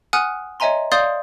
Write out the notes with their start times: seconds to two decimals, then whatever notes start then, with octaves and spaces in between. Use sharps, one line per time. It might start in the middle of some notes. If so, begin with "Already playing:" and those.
0.13 F#5 G#5 D#6 F6 F#6
0.60 C#5 D#5 E5 G#5 A#5 C6
0.92 D5 F5 C6 D#6 G6 A6